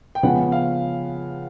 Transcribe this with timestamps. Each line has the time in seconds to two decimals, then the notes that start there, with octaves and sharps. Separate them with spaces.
0.15 G5
0.23 C#3 F3 G#3 B3 F#5
0.52 F5